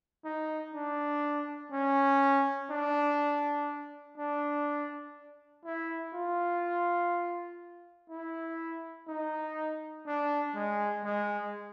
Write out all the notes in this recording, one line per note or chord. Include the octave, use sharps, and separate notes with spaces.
D#4
D4
C#4
D4
D4
E4
F4
E4
D#4
D4
G#3
G#3